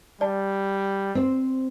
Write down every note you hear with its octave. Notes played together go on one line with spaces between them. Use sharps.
G3 D5 A5
C4 C5